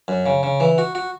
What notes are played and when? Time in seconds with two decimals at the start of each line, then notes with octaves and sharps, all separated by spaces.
0.08 F#2
0.26 C#3
0.43 C#3
0.60 E3
0.78 F#4
0.95 F#4